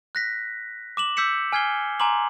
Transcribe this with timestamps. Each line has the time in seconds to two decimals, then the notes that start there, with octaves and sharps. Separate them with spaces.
0.15 F#6 A#6 B6
0.97 D6 E7 F#7
1.17 D6 E6 G6 B6 C#7 E7
1.52 G#5 F6 G#6 C7 G7
2.00 G#5 A#5 C6 D6 F#7